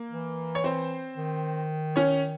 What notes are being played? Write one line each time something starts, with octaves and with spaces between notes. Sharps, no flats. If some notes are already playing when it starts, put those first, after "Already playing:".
Already playing: A#3
E3
C#5
C4 C5
D#3
C#4 C#5